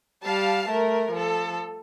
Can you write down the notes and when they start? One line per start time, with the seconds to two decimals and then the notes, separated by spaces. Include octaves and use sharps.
0.24 G3 F5 A5
0.68 A3 A#4
1.12 F3 A4